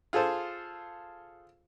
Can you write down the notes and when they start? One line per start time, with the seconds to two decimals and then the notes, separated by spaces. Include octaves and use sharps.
0.13 F4 G#4 A4 C5